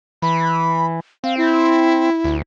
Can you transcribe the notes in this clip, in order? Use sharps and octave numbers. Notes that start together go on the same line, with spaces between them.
E3 B5
C4 F5
E4
D2